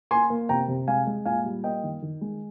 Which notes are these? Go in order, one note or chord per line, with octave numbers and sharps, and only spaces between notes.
A#3 G#5 C6
A#3
C3 G5 A#5
C3
G#3 F5 G#5
G#3
A#2 F5 G#5
G3
A#3 D#5 G5
D#3
D#3
G#3